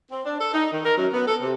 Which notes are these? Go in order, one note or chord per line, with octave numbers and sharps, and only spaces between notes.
C4
D4
A4
D#4
D#3
A#4
F#2
B3
A4
C3